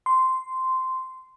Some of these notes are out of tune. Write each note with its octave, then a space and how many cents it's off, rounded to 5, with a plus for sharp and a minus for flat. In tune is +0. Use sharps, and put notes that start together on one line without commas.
C6 -10